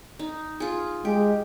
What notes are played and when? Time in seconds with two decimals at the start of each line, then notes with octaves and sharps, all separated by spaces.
0.19 D#4
0.60 F4 G#4
1.05 G#3 G4